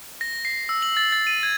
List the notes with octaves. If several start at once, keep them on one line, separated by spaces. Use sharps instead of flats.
A#6
C7
E6
F#7
A6
A6
D#7
G#6